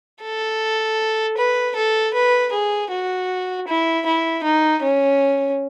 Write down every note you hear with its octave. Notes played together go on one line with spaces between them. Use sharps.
A4
B4
A4
B4
G#4
F#4
E4
E4
D#4
C#4